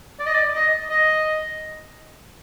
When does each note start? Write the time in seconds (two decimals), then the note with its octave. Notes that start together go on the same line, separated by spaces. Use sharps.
0.19 D5
0.26 D#5
0.34 D5
0.55 D#5
0.90 D#5